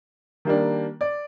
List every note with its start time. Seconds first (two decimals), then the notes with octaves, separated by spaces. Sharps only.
0.45 D#3 G3 A#3 D4
1.01 D5